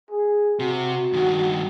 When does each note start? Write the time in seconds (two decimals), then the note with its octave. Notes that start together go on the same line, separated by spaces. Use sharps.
0.11 G#4
0.59 C3 F#4
1.13 G2 D#3